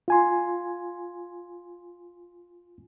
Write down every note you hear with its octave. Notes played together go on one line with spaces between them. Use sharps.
F4 G#5 C6